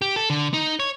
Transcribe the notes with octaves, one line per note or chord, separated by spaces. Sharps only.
G4
A4
D3
D#4
C#5